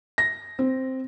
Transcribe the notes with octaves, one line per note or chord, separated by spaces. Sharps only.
A#6
C4